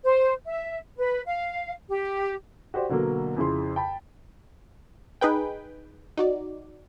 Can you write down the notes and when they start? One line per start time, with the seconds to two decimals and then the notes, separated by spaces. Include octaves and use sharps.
0.05 C5
0.45 E5
0.98 B4
1.26 F5
1.89 G4
2.74 F#4 G4 C5 D5
2.89 B2 D3 F#3 A#3
3.37 F2 C#3 E4 G#4 C6
3.76 G5 A5 B5
5.21 D#4 G#4 B4 G5
6.18 D#4 F#4 D5